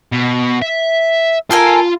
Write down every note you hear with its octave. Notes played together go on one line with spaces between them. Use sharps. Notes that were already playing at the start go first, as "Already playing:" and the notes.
B2
E5
F4 A4 A#4 F5 G#5